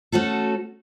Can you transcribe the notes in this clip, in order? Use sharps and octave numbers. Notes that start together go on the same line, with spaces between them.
A3 C#4 F#4 A4